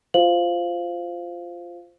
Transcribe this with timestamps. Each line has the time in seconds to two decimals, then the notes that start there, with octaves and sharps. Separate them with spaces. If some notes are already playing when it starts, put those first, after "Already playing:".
0.14 F4 F#4 C5 F5 F#7